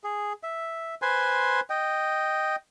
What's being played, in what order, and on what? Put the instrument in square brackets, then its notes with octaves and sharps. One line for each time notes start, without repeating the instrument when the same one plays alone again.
[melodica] G#4
E5
B4 C5 G#5 C6
D#5 G5